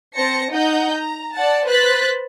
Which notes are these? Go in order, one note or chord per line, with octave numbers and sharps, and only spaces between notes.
C4 C5 A5 A#6 C#7
D#4 D#5 F#5 G6
A#5
D5 F#5 A5
B4 C5 F#6 A6 B6